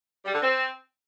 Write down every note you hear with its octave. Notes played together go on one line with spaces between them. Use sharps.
G3
D3
C4